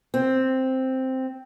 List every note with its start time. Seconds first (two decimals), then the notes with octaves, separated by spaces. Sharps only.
0.14 C4